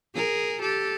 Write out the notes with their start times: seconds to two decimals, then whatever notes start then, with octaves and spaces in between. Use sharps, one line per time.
0.14 G#4 A#4
0.61 G4 A4